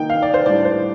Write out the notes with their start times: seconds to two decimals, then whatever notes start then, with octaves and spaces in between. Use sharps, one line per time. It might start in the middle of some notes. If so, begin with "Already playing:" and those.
Already playing: D#3 A#3 D#4 G5
0.10 F5
0.22 D5
0.34 C5
0.46 A2 G3 D4 D5
0.65 C5